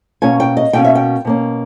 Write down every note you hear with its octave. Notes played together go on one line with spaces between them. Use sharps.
B2 A#3 C#4 G#5
G5
D#5
B2 A#3 C#4 G5
E5
G5
B2 A#3 C#4